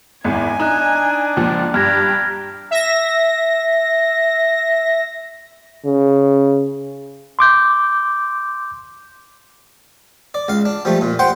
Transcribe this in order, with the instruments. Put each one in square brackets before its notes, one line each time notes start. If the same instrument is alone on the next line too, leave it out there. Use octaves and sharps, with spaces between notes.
[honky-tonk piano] G#1 E2 G#2 [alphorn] E4 [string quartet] G#5
[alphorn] D4 [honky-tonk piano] D#4 [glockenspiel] A#5 F#6
[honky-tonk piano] C#2 A#2 F3
[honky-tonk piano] G2 [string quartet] G4 [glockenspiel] F6 G#6 A#6
[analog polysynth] E5 A#6
[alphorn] C#3
[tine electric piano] C6 D6 G6
[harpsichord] D5
C#2 F5
D4
F3 G3 A3
A#2
C5 F#5 G5 C6